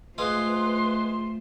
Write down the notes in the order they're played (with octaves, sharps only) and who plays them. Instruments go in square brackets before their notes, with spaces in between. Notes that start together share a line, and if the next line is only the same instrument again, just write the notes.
[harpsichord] G#3 F5 D#6 [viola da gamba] A3 F4 C5 [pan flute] B4 [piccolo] C6